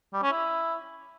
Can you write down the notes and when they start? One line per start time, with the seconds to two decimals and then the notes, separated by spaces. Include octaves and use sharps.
0.13 G3
0.23 C#4
0.32 E4